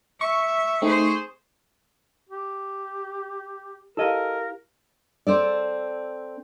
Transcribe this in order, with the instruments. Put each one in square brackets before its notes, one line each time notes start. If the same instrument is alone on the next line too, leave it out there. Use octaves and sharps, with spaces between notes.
[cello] E5 [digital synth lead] C#6
[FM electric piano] A3 C4 D#4 [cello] G#4 C5
[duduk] G4
[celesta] E4 G4 F5 [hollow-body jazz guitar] A4 D#5 [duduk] A#4
[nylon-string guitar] C4 A4 D5